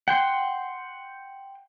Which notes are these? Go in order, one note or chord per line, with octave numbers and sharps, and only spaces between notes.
F#5 G5 C6